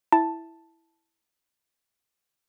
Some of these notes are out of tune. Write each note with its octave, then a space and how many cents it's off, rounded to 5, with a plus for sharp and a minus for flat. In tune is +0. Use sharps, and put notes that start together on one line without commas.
E4 +0 A5 +0